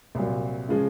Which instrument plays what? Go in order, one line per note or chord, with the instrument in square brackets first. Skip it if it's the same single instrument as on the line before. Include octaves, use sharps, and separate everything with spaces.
[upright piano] C2 A#2 F#3
C#3 F3 G#3